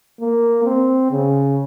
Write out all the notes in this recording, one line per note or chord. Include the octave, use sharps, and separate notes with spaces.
A#3
C4
C#3